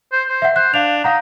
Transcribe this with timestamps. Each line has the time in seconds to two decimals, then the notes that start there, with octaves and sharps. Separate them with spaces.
0.12 C5
0.29 C5
0.42 E5 F#5
0.56 C5 F#6
0.74 D4 F5 F7
1.04 D#4 F5 F#5 A#5